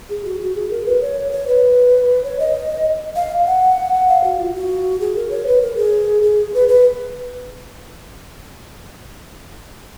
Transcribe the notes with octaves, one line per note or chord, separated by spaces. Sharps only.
G#4
F#4
F#4
G#4
A#4
B4
C#5
C#5
B4
C#5
D#5
F5
F#5
F5
F#4
F4
F#4
G#4
A#4
C#5
B4
A#4
G#4
G#4
B4
B4